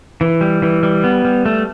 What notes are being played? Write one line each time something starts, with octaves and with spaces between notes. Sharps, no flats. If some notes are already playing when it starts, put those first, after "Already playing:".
E3
G3
E3
G3
B3
G3
A3